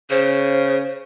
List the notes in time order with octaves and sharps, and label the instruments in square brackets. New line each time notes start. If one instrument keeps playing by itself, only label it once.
[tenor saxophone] C#3 [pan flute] C5